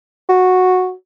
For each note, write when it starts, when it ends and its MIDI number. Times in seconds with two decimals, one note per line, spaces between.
0.29 0.92 66